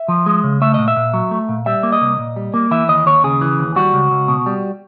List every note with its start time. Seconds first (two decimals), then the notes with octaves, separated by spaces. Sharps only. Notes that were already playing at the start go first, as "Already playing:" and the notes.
Already playing: E5
0.08 F3
0.26 G#3
0.44 C#3
0.62 A3 E5
0.74 A#2 D#5
0.88 E5
0.96 A#2
1.13 F#3
1.31 A3
1.49 A#2
1.66 G3 E5
1.83 A#3
1.92 D#5
2.02 C2
2.19 A#2
2.36 G3
2.54 A#3
2.71 E3 E5
2.89 D#2 D#5
3.06 D#2 C#5
3.24 C#3 G#4
3.41 E3
3.59 D#2
3.76 G3 F#4
3.94 C#2
4.11 C#2
4.28 B2
4.46 G3